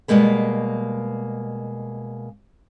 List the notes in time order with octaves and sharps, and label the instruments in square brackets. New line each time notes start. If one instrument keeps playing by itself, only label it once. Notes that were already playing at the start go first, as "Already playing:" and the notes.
[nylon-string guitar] B2 G3 G#3 A#3 B3